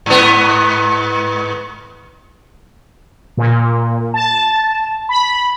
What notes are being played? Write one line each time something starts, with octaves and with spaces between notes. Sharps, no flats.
G#2 B3
A#2
A5
B5